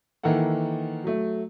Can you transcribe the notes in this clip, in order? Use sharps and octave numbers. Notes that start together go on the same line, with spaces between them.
D#3 E3 A#3 A4 F#5
F#3 A3